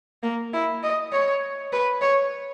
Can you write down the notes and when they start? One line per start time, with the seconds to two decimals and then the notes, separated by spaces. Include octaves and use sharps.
0.23 A#3
0.53 E4
0.83 D#5
1.12 C#5
1.73 B4
2.01 C#5